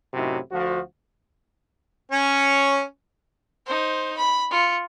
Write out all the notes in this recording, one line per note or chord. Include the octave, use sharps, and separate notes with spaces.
F#2 A2 C3 D#4 E4 F#4
D2 F3 F#4
C#4 C#5
D#4 C5
B5
F4 C#7